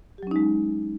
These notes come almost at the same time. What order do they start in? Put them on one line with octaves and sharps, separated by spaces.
G4 F#3 C#4 D#4 G#3